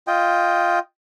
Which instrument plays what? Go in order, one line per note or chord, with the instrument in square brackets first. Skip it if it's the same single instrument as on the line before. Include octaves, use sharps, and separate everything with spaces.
[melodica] F4 D#5 G5